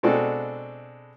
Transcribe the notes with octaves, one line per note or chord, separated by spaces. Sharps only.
B2 G#3 C4 D4 F#4 A4